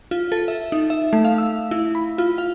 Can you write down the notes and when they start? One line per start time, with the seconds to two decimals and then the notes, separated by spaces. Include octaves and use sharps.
0.11 F4
0.32 A4
0.48 E5
0.72 D#4
0.90 E5
1.13 A3
1.25 F5
1.38 E6
1.71 E4
1.95 B5
2.18 F4
2.38 F5